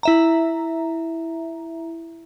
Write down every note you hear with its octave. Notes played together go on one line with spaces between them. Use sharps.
E4 E5 A#5